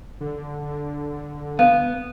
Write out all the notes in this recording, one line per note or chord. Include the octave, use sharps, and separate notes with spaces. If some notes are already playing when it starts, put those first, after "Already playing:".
D3
B3 F5